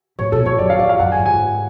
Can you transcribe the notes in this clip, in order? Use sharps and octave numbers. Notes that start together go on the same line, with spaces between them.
A2 C#5
B2 A4
A2 C#5
F#2 D5
F5
A2 D5
F5
F#2 F#5
G#5
G#2
G#5